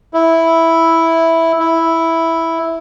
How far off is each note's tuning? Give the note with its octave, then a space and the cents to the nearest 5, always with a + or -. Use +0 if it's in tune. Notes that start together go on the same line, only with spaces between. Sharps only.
E4 -5
E4 -5